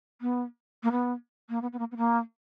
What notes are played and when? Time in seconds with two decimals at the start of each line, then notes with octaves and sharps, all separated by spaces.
0.21 B3
0.83 A#3
0.92 B3
1.49 A#3
1.62 B3
1.73 B3
1.79 A#3
1.91 B3
1.97 A#3